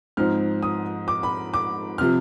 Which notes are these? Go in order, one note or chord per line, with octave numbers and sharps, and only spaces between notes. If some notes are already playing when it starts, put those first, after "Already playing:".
G#2 F3 C4 D#4 F6
D#6
D6
B5
D6
C3 F3 F6